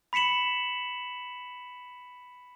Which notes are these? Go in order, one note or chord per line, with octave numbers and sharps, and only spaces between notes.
B5 B6 C#7 E7 F#7